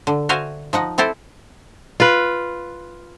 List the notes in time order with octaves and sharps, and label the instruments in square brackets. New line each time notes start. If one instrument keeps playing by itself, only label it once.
[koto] D3
F#4 C5 E5 F5 G#5
F3 D#4 F#5
C4 E4 A4 C5 D5
[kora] F4 B4